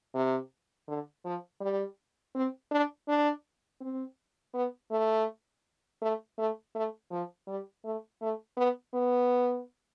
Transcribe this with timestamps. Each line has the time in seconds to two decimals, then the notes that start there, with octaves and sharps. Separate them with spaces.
0.14 C3
0.88 D3
1.25 F3
1.61 G3
2.35 C4
2.71 D4
3.08 D4
3.80 C4
4.54 B3
4.91 A3
6.02 A3
6.38 A3
6.75 A3
7.11 F3
7.47 G3
7.85 A3
8.21 A3
8.57 B3
8.94 B3